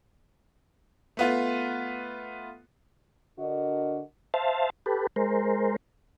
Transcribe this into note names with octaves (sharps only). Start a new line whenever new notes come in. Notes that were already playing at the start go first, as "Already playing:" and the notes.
A3 B3 F4
D3 D4 F#4 A#4 D#5
C5 E5 F5 A5
G4 A4 B4
G#3 A#4 C5